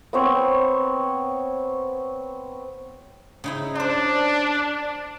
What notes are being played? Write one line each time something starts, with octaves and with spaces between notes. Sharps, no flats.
B3 C4 C#5
C#3 D#4 E4
D4 C5 C6